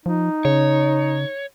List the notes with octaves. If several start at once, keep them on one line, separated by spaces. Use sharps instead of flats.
F3 D#4
C#3 C#5